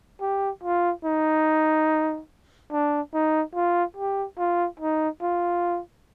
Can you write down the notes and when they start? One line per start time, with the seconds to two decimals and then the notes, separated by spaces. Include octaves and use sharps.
0.21 G4
0.64 F4
1.05 D#4
2.72 D4
3.14 D#4
3.55 F4
3.97 G4
4.38 F4
4.80 D#4
5.22 F4